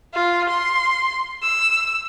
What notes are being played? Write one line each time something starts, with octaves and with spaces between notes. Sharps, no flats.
F4
C6
E6